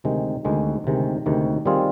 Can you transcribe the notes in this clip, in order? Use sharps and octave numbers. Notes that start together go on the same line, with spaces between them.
D2 C3 D#3 G#3
D2 C3 D#3 G#3
D2 C3 D#3 G#3
D2 C3 D#3 G#3
D#3 G3 C4 F4 G#4